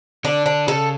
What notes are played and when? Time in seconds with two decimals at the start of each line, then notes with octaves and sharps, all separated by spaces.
0.24 D3 D4
0.46 D4
0.67 C#3 A4